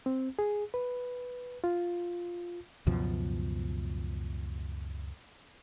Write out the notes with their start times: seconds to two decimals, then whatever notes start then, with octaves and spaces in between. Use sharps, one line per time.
0.06 C4
0.39 G#4
0.74 B4
1.64 F4
2.87 C#2 F#2 B2 F3